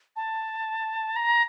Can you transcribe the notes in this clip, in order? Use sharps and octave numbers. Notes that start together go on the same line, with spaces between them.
A5
A#5